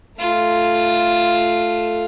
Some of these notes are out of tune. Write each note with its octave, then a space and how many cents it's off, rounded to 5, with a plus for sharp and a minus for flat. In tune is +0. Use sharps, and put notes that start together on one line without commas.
A3 +0 F4 +0